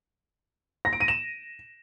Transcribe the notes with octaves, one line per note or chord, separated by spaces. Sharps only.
A#6
D7
D#7
E7